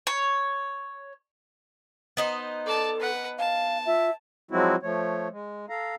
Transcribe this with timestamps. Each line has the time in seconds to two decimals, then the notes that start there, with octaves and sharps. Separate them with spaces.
0.07 C#5
2.17 B3 D#4 C5
2.66 A4 D5 A5
3.00 B4 F#5
3.38 F5 A5
3.86 F4 E5
4.51 F3 F#3 G#3 C4 E4 F#4
4.83 F3 A3 C#5
5.31 G#3
5.69 A4 F5 A#5